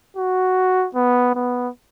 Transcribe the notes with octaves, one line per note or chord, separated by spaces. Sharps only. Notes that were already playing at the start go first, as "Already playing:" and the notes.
F#4
B3
B3